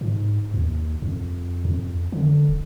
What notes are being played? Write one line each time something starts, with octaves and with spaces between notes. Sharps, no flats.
G#2
D#2
F2
F2
D3
D1